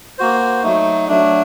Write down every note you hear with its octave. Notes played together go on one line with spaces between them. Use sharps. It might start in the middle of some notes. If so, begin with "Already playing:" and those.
A#3 F#4 C5
F#3 A3 D#4
F#3 A3 D4